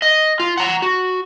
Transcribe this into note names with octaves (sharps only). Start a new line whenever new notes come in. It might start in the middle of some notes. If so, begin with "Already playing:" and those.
D#5
F4
F#5 A#5
F#4